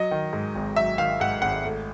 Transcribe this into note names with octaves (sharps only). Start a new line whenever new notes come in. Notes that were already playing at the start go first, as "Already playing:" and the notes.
Already playing: F#3 D#5
D#3
G#2
G#1
F#3 E5
D#3 F5
G#2 F#5
G#1 F#5
A3